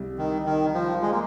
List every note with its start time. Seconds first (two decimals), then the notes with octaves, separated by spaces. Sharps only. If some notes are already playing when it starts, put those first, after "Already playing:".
Already playing: C2 C3 G3
0.18 D#3
0.46 D#3
0.74 F3
1.02 G#3
1.11 A#3